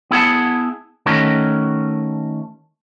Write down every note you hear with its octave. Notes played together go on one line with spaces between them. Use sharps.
B3 E4 G#4 F#5 A5
D#3 A3 C#4 F#4 A#4